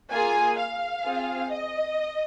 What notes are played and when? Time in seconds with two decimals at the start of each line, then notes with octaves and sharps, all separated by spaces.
0.11 A#3 F4 G#4 G#5
0.58 F5
1.04 C4 F4 G#4
1.52 D#5